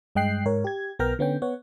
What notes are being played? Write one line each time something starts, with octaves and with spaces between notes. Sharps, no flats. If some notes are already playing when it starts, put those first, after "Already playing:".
G2 G#3 D#5 G5 F#6 C7
G#2 A#4 C#5
G4 G#6
B1 B3 A#4 G5 A#5 F6
D3 B3 C#4 G5
B3 C#5 F#5